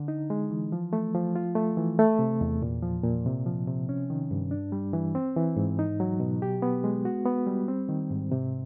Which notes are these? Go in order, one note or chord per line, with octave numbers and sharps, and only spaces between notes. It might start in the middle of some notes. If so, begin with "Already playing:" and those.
Already playing: D3
D#4
G#3
E3
F3
A3
F3
F4
A3
E3
A3
C3
E2
A#2
F3
A#2
C3
F3
C3
C#4
D#3
G2
D4
G3
E3
C4
E3
G#2
D#4
F#3
B2
G4
B3
G#3
F#4
B3
G3
C4
D#3
G#2
C3